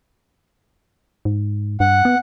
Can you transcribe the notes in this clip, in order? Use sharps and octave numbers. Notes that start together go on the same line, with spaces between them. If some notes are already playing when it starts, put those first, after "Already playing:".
G#2
G2 F#5
B3